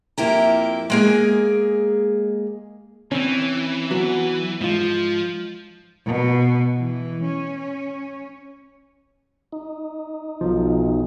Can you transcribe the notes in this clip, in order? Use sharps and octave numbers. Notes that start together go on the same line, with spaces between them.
F2 A#3 E4 G4 A#5
G#3 A#3 G#4
E3 C4 C#4
F#3 B3 F#4
G#2 F3 F4
B2
E3
C#4
D#4
B1 F3